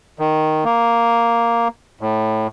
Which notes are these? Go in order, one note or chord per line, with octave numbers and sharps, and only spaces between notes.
D#3
A#3
A2